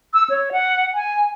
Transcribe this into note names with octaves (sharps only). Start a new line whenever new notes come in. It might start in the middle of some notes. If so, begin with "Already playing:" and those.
E6
C#5
F#5
G#5